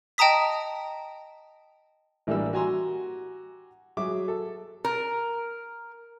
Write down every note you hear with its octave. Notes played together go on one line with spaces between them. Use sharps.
D#5 G5 A5 A#5 D#6 B6
A1 E3 G3 A#3 D4 E6
F#4 G4 G#5 A#5 C6 E6
F#3 G#4 E5 D6
A4
A#4